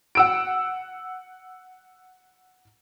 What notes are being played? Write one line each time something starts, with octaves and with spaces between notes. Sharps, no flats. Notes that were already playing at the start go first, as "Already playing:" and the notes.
F#5 E6 D7